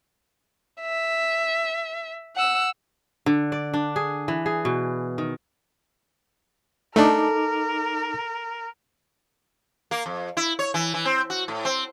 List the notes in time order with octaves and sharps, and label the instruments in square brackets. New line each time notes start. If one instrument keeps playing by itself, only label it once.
[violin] E5
F#5 E6
[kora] D3
D5
D4
G#4
E3
G#4
B2
D#3
[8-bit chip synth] A3 D4 [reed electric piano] D#4 D6 [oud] A4 [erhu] A#4
[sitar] A#3
F2
E4
C#5
E3
E3
C4
F#4
A2
C4